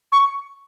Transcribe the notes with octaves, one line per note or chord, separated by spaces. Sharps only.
C#6